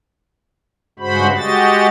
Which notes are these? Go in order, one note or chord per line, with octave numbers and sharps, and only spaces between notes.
G2 C#3 G#3 F#4 C5 B5
G#3 F#4 G4 D#5 A6